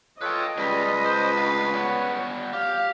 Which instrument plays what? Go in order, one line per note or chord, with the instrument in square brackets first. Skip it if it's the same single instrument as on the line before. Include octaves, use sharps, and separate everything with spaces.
[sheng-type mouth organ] F4 A4 C#5 [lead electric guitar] B4 G5 [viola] D#5
[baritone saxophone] C#2 [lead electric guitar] G3 [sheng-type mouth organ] B4
[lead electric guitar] C5
D2 F5
[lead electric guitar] G3 B3 [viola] C#5
[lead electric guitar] G4 [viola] F5